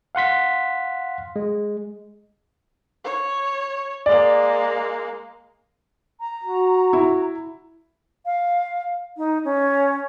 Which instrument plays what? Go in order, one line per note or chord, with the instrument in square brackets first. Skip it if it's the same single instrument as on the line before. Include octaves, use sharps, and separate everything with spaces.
[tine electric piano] F5 F#5 C6 B6
G#3
[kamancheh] C#5
[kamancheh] G#3 A#3 [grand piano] D5
[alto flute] A#5
[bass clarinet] F#4
[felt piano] E4
[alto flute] F5
D#4
C#4